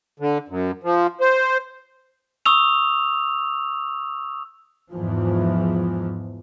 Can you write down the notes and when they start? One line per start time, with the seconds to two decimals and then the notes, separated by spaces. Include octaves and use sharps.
0.20 D3
0.48 F#2
0.83 F3
1.21 C5
2.46 C#6 D#6 E6 F7
4.91 E2 G#2 E3 F3